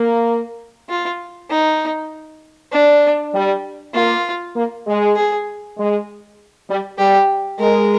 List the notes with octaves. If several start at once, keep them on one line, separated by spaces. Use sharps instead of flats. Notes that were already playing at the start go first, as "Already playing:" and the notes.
Already playing: A#3
F4
D#4
D4
G3
A#3 F4
A#3
G#3
G#4
G#3
G3
G3 G4
G#3 A#4